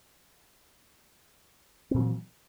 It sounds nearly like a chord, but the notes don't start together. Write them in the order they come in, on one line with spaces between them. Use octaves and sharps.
C4 A#2 F#3 E3